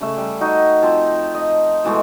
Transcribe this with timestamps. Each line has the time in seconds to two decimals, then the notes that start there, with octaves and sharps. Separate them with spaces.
0.01 C#3 A3 E5
0.17 G3
0.41 D#4 F#4
0.82 F3 C4
1.35 D#5
1.84 B2 E3 G#3 A3